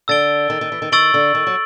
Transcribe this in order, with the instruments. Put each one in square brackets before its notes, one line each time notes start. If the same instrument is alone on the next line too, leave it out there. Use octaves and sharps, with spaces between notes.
[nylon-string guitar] D3 [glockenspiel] E6 A6 D7 G7
[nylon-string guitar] D#3
D#3
E3
D#3
[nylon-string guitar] D#3 [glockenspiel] C#6 E6 A6 D7 F#7
[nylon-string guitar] D3
D#3
F#3